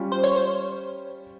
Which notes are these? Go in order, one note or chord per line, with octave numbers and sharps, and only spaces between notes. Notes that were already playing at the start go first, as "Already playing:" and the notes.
Already playing: G3 C#4 F4
C5
C#5
C5